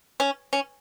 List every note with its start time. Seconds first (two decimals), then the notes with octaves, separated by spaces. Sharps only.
0.20 C#4
0.53 C#4